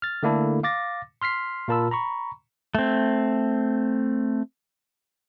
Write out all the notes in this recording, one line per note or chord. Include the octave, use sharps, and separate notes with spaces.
F6 A6
D3 A3 A#3 D4 E4 A4
F5 D6 A6 A#6
C6 F6 B6 C7
A#2 F4 A#4 A5 B5 E6
A#5 B5 C#6
A3 C4